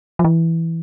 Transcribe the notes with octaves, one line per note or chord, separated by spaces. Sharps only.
F3
E3